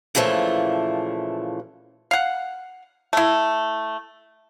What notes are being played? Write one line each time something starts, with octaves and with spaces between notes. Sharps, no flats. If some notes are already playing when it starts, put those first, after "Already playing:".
A#2 C#3 E3 F3 A3
F5 F#5
A3 E4